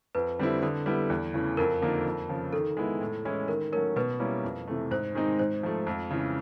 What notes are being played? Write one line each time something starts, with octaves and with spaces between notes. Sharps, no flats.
F2 B4
D3 G3 C4 E4
D3 A4
G3 B3 E4
E2
C#3 E3 A3
F2 A#4
D3 F3 A#3 D#4
F2
C#3 F3
D#3 A4
G#3 B3 E4
A2
E3 G#3 C#4 E4
D#3 A#4
F#3 A3 C#4 A#4
B2 B4
G3 A#3 C#4 E4
F2
C3 E3 A3
G#2 C5
D#3 G#3 C4 D#4
G#2 C5
F3 A3
F2
C#3 E3